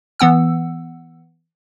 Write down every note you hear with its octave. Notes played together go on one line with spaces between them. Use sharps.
E3 B3 F#5 E6